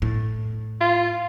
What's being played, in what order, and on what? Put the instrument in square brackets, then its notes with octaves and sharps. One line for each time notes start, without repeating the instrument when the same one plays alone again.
[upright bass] A2
[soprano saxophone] F4